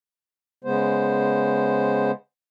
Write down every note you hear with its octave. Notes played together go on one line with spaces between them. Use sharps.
C#3 G#3 B3 C5